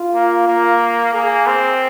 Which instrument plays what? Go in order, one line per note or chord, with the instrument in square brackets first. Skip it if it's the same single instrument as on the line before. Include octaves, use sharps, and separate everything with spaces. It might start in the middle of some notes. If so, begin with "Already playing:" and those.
Already playing: [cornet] F4
[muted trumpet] A#3
A#3
[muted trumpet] A#3 [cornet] G#4
[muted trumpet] C4